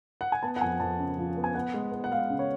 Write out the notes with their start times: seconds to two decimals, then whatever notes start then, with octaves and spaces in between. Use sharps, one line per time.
0.21 F#5
0.32 G#5
0.43 B3 A5
0.56 F#5
0.61 F2 G#5
0.80 F2 A5
0.99 C#3
1.18 F3
1.37 B3
1.44 G#5
1.55 B3 F#5
1.74 G#3
1.92 B3
2.04 F#5
2.11 G#3 F5
2.30 C#3
2.39 C#5